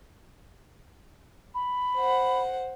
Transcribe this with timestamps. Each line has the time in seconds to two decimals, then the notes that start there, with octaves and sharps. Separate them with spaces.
1.55 B5
1.97 C5 F#5